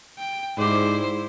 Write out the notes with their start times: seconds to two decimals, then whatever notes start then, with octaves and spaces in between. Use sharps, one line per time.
0.19 G5
0.58 G#2 E4 G4 C5 D5